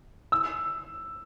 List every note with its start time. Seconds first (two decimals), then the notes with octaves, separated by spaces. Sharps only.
0.32 E6